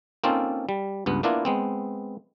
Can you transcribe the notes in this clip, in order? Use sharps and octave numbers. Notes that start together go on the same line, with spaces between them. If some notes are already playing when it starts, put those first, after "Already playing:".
A#3 C4 C#4 D#4 F4 A4
G3
C#2 G2 B3
A#3 B3 D4 E4 F4 A#4
G#3 B3 C4